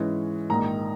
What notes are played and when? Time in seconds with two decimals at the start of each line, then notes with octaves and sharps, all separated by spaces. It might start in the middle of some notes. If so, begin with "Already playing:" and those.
Already playing: G#2 E3 G#3 C#4
0.50 A#1 G#2 D#3 A#5